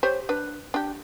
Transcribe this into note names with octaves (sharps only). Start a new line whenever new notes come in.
G4 C5 C#5
D4 B4
D4 G4